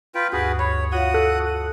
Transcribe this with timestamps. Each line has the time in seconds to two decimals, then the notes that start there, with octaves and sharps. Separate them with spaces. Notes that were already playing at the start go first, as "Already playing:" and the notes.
0.15 F4 B4 G5
0.33 D2 G2 F#4 G#4 B4
0.59 C#5 B5
0.92 F4 F#4 C#5 F5 F#5 D#6
1.14 A4 F#6
1.45 F#5